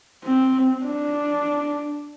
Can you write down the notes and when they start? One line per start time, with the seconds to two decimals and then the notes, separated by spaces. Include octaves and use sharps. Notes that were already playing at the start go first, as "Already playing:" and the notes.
0.24 C4
0.85 D4